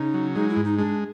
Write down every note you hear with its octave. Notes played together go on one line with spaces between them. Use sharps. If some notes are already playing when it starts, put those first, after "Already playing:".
Already playing: C#3 D#4
F#3
G#3 D#4
E4
G#2
D#4
G#3 D4